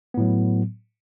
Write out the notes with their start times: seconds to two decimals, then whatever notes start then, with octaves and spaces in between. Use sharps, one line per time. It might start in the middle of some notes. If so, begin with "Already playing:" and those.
0.14 B3
0.17 A2
0.20 F#3